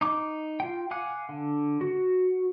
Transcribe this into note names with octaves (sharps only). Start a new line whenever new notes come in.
D#4 D6
F4 G5
F5 F#5 G#5 D6 F#6
D3
F#4